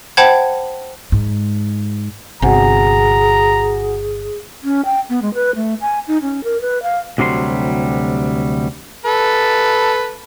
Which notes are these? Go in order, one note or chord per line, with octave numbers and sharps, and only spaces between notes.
C5 F#5 G5 A5 B5 G#6
G#2
G1 C3 F#4 G#4 F#5 G#5 A#5
C#4
G5
B3
G#3
B4
A3
G#5
D#4
C#4
A#4
B4
F5
D2 C3 F#3 G3 C6
A4 B4